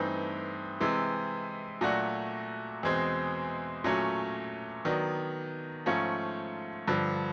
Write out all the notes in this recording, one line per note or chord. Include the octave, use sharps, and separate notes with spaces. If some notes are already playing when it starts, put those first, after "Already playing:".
Already playing: G2 E3 A3 C4 D#4
C3 E3 G#3
A#2 F#3 A3 D4 F#4
E2 B2 G#3 C4
A#2 F#3 A3 C#4
D#3 F#3 B3 D4
G#2 F3 A3 C#4 F4
G2 D3 F3